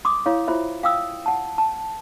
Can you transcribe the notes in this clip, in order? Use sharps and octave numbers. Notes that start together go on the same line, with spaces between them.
C6 D6 D#6
E4 C#5 F5
E4 F4 C5 E5
F5 G5 D#6 E6
F#5 A5
A5